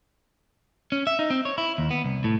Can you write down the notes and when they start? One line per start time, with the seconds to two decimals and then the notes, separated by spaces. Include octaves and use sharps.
0.92 C#4
1.07 E5
1.19 D#4
1.30 C4
1.45 C#5
1.58 E4
1.78 D#2
1.91 B3
2.04 C2
2.24 A2